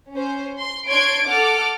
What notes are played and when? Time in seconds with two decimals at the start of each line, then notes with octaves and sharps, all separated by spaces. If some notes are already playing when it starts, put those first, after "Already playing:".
0.12 C#4 C5
0.59 C6
0.89 D4 C#5 C6 G#6 D7
1.28 A4 F#5 D6 F6